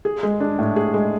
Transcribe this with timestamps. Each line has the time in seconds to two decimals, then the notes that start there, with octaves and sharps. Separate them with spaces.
0.05 G#4
0.23 G#3
0.40 D4
0.59 A2
0.76 G#4
0.94 G#3